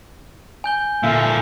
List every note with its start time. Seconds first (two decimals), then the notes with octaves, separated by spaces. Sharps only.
0.64 G#5 G6 G7
1.03 A#2 D3 E5 F5